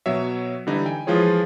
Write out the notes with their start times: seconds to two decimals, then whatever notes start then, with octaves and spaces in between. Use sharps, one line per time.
0.06 B2 F#3 C#5 E5
0.67 D3 E3 G3 D#4 E4
0.86 G5 G#5
1.07 E3 F3 G#3 F4 G#4 C#5